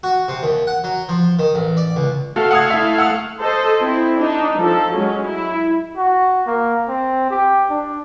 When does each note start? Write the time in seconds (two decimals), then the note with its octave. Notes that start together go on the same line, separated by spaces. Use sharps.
0.03 F#4
0.28 C3
0.43 D#2
0.67 F#5
0.84 F#3
1.09 F3
1.39 D#3
1.55 A1
1.77 D5
1.96 C#2
2.36 A3 F#4 A4 F5
2.51 F#5 D#6 G#6
2.70 E4 E5
2.98 F#5 E6
3.40 A4 C5 D#5
3.80 C4 E4
4.19 D4 D#4
4.58 F3 A4
4.94 F#3 G#3 C#4
5.26 E4
5.97 F#4
6.47 A#3
6.88 C4
7.31 G4
7.70 D4